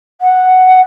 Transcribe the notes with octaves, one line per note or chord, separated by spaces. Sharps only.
F#5